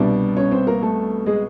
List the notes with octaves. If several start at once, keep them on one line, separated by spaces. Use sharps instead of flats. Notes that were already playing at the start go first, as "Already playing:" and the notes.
Already playing: C2 B2 G3 D4 D5
C#4 C#5
C4 C5
A#3 A#4
A3 A4
G#3 G#4